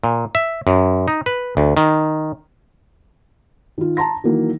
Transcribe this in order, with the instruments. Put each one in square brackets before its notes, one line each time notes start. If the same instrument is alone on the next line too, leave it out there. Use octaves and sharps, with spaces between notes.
[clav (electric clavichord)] A#2
E5
F#2
D#4
B4
D2
D#3
[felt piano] D#3 F4
A5 A#5 C6 A#6
D#3 E3 F#3 A#3